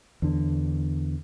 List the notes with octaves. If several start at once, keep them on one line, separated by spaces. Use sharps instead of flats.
E2 D3